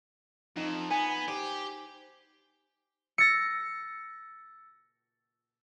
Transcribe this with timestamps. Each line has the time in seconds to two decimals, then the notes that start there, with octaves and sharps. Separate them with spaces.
0.57 F2 D#4 E7
0.90 B3 G#5
1.28 G4 C5
3.18 E6 A6 A#6 C#7